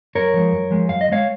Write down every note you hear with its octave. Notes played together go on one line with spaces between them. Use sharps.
F#2 A#4 C#5
F3 G#3
F#2
F3 G#3
F#2 F5
D#5
F3
G#3 C#5 F5